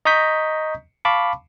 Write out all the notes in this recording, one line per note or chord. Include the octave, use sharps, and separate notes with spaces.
D#5 A#5 C#6 D#6 G6 B6
F5 A5 B5 C#6 D6